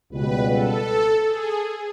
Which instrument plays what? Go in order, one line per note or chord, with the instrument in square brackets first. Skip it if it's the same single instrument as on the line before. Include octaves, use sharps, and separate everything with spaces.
[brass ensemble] C#2 B2 G3 [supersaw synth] B4
[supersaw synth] A4
G#4